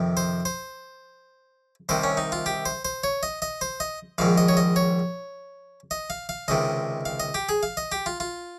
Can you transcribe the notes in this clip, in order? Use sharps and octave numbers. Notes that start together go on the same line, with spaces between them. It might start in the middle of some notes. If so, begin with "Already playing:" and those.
Already playing: F2 C3 D#3
C5
C5
C2 C3 D#3 C5
C#4
D#4
F4
G4
C5
C5
C#5
D#5
D#5
C5
D#5
A#1 G#2 D#3 F5
D#5
C#5
D#5
C#5
D#5
F5
F5
C#2 C3 D#3 D#5
F5
D#5
G4
G#4
F5
D#5
G4
F4
F4